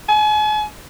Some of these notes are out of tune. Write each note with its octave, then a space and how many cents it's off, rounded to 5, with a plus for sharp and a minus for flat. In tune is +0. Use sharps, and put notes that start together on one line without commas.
G#5 +40